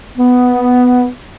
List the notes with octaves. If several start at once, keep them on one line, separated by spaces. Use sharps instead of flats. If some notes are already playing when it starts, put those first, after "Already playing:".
B3